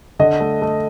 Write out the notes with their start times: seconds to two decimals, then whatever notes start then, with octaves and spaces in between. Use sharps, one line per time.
0.19 D3 D#5
0.40 A3
0.62 A3